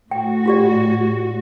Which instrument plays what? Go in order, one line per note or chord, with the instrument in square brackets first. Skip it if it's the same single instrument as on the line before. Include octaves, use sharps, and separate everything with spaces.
[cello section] A2 F#4 [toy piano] G5
[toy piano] F4 G4 D5